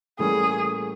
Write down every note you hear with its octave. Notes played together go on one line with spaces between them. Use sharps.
A2 E3 G3 A#3 C#4 G#4